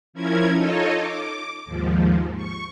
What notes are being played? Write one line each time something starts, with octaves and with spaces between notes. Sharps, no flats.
F3 C#4 E4 A#4 G#6
D#4 F4 A4 C#5 D#5
D6
D#2 G#2 F3
C#6